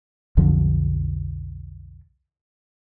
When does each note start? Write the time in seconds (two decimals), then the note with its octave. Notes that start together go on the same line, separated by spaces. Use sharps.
0.37 B1 F2 D3 F3